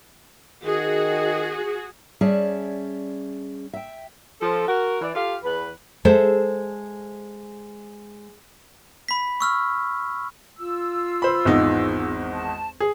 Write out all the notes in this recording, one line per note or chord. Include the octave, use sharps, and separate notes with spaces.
D#3 F#4 G#4
G3 C#4 G#4 D5 E5 A5
E5 G5
F3 A4
F#4 A#4
E3 D5
F4 G4 A4 F5
E2 B4
G#3 A4 C5 E5
B5 B6
C#6 E6 F6
F4 E6
C5 B5
G#1 E2 D#4
A5
G#4